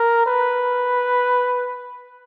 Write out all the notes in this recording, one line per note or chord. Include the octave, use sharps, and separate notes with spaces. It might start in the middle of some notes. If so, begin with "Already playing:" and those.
Already playing: A#4
B4